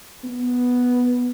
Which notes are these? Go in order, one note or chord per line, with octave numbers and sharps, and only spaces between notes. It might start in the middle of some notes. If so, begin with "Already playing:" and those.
B3